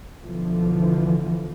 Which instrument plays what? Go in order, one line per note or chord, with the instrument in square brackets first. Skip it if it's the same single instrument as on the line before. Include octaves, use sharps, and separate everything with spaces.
[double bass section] B1 D3 E3 F3